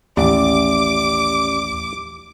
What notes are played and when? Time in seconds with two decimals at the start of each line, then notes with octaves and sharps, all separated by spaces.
0.17 A1 D#2 C#4 G4 D5 D6